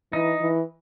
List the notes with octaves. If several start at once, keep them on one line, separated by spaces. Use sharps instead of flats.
E3 D#4
E3